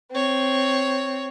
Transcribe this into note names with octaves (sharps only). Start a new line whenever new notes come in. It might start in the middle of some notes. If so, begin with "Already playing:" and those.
C4 C#5